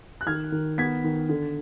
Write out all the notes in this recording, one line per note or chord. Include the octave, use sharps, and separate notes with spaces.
F#6
D#3 F6 G#6
D#3
B3 G#6 B6
D#3
D3